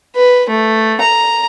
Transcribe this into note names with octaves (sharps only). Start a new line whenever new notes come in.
B4
A3
A#5